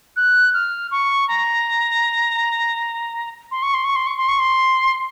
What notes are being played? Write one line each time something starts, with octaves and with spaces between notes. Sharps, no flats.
F#6
F6
C#6
A#5
C6
C#6
C6
C#6
C6
C#6
C6
C#6
C6